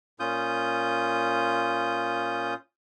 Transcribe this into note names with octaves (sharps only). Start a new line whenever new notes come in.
A#2 C#4 F4 D#6 G6